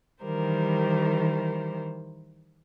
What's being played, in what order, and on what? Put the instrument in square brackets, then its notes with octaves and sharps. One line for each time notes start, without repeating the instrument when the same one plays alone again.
[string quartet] D#3 E3 G3 A#4 C5